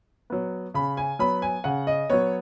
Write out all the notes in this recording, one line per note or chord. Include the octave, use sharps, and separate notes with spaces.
F#3 B3
C#3 B5
G#5
F#3 B3 B5
G#5
C#3 F#5
D#5
F#3 B3 C#5